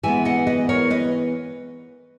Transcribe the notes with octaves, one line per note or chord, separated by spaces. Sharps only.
E3 G#3 B3 E5 G#5
D#5 F#5
B4 D#5
A#4 C#5
B4 D#5